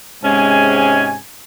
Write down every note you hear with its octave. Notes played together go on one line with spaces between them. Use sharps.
G#2 C3 G#3 C#4 G#5